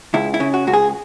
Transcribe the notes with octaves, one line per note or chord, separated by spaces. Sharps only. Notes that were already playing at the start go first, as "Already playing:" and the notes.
C#2 E4
E4
C#3
F#4
C#2 F#4
G#4